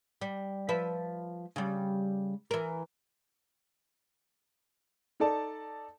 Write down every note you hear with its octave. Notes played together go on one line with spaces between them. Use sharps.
G3
F3 B4 E5
C#3 G3
E3 A#4
D#4 A4 D5 A5